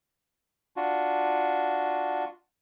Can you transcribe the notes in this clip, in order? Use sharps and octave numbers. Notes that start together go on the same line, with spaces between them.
D4 F4 F#4